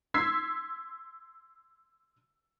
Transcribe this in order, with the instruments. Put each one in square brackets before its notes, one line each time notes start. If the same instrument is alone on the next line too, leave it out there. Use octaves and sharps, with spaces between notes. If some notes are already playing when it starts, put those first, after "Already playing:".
[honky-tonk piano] C6 E6 G#6 B6 C7